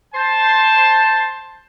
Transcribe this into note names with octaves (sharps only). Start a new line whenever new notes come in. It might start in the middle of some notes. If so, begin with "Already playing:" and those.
C5 A5